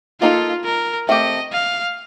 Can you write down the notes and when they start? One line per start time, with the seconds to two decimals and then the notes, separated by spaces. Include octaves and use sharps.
0.21 A#3 D#4 F4 A4
0.65 A#4
1.09 A3 C4 G4 D#5
1.52 F5